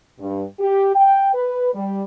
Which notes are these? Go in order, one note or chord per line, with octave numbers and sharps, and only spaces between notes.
G2
G4
G5
B4
G3